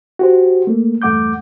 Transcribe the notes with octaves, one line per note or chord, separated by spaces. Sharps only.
F#4 G4 C5
A3 A#3
E2 G2 A3 F#5 D6 G6